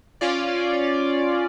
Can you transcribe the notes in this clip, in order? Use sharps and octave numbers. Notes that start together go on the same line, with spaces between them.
C#4 F4 D5